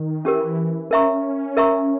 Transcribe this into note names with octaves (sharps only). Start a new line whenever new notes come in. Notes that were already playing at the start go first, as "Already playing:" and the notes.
Already playing: D#3
E3 C#4 G4 A#4
C#4 A#4 E5 A#5 C#6
A#4 E5 A#5 C#6